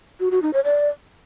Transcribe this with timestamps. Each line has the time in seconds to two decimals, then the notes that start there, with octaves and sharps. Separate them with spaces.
0.20 F#4
0.31 F#4
0.42 D#4
0.53 C#5
0.65 D5